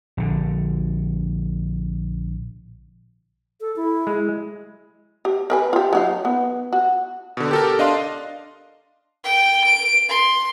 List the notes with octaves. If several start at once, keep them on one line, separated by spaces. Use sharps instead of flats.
A#1 D3
A4
E4
G#3
G4
A#4 B4 G#5
F4 G4
F#3 D#4 F5
B3
F#4
B2 D3
G4 A4 A#4
D4 D#5 F5 C6
G5
D7
C6